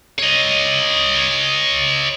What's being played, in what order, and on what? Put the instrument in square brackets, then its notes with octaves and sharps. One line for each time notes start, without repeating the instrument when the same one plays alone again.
[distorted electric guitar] C#5 D#5